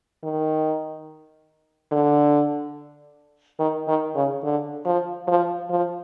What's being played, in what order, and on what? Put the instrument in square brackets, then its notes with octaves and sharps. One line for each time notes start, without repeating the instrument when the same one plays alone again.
[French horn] D#3
D3
D#3
D#3
C#3
D3
F3
F3
F3